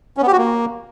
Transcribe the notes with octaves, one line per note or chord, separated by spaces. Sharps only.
C#4
B3
G4
F#4
A#3